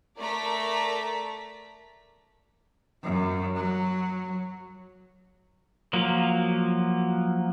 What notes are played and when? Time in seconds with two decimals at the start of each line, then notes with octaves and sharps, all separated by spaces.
0.18 A3 A#4 D5 A#5 B6
3.03 F#2
3.56 F#3
5.93 F3 F#3 A#3